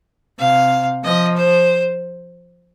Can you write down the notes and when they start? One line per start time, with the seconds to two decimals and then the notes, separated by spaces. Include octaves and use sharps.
0.39 C3 F5
1.04 F3 D#5
1.36 C5